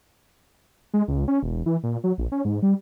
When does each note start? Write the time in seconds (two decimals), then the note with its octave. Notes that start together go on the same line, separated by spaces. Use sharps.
0.94 G#3
1.08 C#2
1.28 C#4
1.43 E1
1.66 E3
1.83 A#2
2.04 F#3
2.18 A#1
2.32 C#4
2.45 G#2
2.62 G3